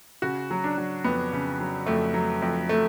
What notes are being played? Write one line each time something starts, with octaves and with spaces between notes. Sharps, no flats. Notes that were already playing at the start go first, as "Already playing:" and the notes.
C#3 F#4
F#3
D4
F#3
F2 B3
C#3
F#3
F2 A3
F#3
F2
A3